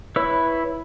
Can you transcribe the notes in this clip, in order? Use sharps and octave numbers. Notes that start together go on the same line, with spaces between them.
E4 B4 C#5 E6